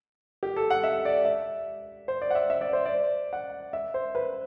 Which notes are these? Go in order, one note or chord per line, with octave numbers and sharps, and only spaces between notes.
G4
A4
F#5
E5
D5
E5
C5
D5
F#5
E5
E5
D5
C5
D5
F#5
E5
C5
B4